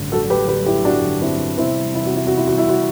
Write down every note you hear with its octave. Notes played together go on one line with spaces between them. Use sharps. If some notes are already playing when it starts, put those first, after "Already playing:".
Already playing: A1 G2 D3 F#3
F#4 A4
G4 B4
G4 B4
E4 G4
D4 F#4
C4 E4
E2 C3 G3 C4 E4
E4
F#4
E4
F#4
E4
F#4
E4
F#4